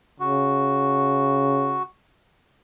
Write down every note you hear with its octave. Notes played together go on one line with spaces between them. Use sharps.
C#3 F#4